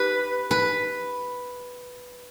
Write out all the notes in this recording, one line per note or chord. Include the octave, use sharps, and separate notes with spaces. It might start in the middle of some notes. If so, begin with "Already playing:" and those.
Already playing: G4 B4
B4